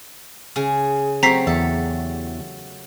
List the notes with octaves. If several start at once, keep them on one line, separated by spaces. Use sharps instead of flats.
C#3 G#4
F#3 A3 C4 G4 A#5 B6 C7
E2 A4